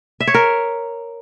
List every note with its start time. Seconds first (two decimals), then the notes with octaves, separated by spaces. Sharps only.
0.20 E5
0.27 C#5
0.34 A#4